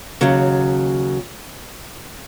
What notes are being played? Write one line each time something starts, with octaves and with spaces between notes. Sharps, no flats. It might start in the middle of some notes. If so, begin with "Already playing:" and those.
D#2 C#3 F#3